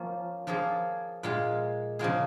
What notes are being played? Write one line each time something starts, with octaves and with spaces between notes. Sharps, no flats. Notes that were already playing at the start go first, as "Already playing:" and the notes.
Already playing: F3 A#3 C#4
F3 A#3 F4 G#4
A#2 G#3 F4 G#4
C#3 F3 A#3 F4 G#4